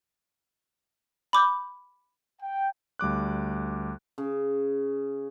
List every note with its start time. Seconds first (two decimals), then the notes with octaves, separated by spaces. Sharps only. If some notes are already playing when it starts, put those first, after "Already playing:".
1.33 B5 D6 G6
2.41 G5
2.99 D2 G3 D6 F#6
4.18 C#3